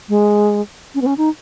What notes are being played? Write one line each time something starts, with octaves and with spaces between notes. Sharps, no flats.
G#3
C#4
B3
C#4
D#4